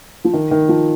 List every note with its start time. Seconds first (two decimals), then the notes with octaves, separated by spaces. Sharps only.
0.25 F3
0.33 D#3
0.51 D#3
0.69 F3